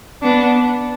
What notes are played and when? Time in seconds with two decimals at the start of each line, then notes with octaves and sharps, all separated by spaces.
0.22 B3 D4